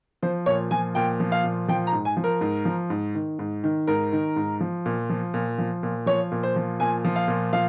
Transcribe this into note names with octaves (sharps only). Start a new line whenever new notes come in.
F3 C5
A#2 C#5
F3 G#5
A#2 G5
F3
F5
A#2
F3 G5
A#5
G#2
G#5
F3
A#4
G#2
F3
G#2
D#3
G#2
D#3
G#2 A#4
D#3
G#2
F3
A#2
F3
A#2
F3
A#2
F3 C#5
A#2
C5
F3
A#2 G#5
F3
F5
A#2
F3 F5